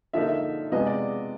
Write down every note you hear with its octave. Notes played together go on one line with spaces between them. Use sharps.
D3 F3 A#3 D#4 E5
E5
C3 F3 G#3 B3 D#5
D5